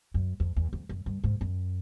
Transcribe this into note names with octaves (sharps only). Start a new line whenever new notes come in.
F#2
F2
E2
F2
F#2
G2
G#2
F#2